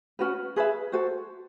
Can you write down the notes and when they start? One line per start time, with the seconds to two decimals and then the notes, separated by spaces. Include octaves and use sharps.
0.19 C#4 F#4 B4
0.56 G#4 B4 E5
0.92 F#4 A4 C5